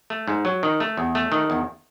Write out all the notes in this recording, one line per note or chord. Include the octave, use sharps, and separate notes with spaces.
A3
G#2
F#3
D#3
A3
E2
A3
D#3
E2